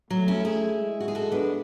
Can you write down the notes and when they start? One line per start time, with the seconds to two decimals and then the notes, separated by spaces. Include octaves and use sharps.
0.10 F#3 A3
0.28 C#4 E4
0.45 E4 G#4
0.80 G#3
1.00 F#4
1.08 G#4
1.15 F#4 A4
1.32 B3 D4